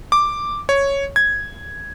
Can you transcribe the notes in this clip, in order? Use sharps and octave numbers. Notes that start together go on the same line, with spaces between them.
D6
C#5
G#6